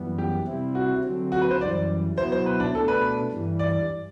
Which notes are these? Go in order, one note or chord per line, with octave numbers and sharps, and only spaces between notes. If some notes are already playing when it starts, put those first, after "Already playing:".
Already playing: F#2 E3 G3 B3
G4
C3 G3 C4 E4
F#4
D3 F#3 C4
F#4
B4
C5
F#2 E3 G3 D5
B2 F#3 B3 E4 C5
C5
B4
D4
B2 A3 D4 A4
B4
G2 E3 G3
D5